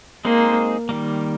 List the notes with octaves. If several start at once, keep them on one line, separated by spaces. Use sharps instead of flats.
G#3 A#3 C4 D#4 G#4 C5
D#3 G3 A#3